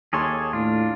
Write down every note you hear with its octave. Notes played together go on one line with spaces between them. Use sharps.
D#2 G#4 A4 C#5 C6 D6
A2 D4 F4